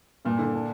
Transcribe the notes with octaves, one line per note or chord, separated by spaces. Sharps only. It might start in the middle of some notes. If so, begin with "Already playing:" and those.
G2 A#2
D3
D4